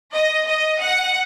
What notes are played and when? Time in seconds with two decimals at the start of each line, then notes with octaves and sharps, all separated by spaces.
0.13 D#5
0.46 D#5
0.80 F#5